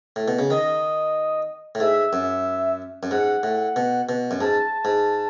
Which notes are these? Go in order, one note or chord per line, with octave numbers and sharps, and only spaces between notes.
A2
B2
C#3
D#3 D#5
A2
G#2 E5
F#2
F#2
G#2 F#5
A2
B2
B2
F#2
G#2 A5
G#2